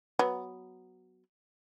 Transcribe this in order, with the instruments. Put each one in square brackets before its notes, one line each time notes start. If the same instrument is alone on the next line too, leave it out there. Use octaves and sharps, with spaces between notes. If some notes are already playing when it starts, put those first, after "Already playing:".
[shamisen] F#3 B3